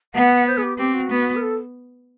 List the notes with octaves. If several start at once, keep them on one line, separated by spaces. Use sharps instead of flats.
B3 F#5
C5
G#4
G4
C4 G4
F#4
B3
A#4
A4